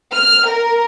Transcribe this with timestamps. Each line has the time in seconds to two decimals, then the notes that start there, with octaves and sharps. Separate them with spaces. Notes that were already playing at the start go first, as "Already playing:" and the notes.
0.12 F6
0.47 A#4